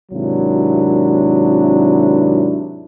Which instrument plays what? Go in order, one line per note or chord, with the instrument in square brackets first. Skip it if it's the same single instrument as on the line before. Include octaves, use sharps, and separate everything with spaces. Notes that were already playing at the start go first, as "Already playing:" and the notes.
[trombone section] G#1 C3 D#3 F#3 D4 E4